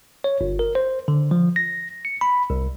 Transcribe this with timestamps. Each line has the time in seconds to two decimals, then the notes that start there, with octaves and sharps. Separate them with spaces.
0.24 C#5
0.41 G1
0.59 A#4
0.75 C5
1.08 D3
1.31 F3
1.56 A#6
2.05 C#7
2.21 B5
2.50 C2